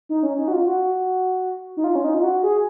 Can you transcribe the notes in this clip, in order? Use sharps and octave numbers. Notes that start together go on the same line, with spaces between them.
D#4
C#4
D#4
F#4
F4
F#4
D#4
F4
C#4
D#4
F4
F#4
G#4